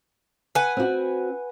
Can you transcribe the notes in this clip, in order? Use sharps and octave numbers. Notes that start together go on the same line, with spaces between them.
B4 F#5 G#5
C4 F#4